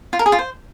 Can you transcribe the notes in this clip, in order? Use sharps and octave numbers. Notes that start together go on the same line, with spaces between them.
F4
A#4
G#4
F4
C5